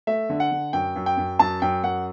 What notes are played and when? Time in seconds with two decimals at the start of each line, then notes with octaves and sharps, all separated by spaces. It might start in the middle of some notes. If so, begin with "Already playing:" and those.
0.07 A3 E5
0.29 D3
0.40 F#5
0.51 D3
0.73 F#2 G5
0.96 F#2
1.06 G5
1.18 F#2
1.39 F#2 A5
1.62 F#2 G5
1.84 F#2 F#5